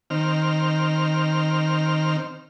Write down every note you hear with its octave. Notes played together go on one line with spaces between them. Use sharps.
D#3 C4 F6